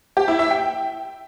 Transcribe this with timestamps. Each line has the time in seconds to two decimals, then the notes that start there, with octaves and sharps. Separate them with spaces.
0.17 G4
0.28 E4
0.39 E5
0.50 G5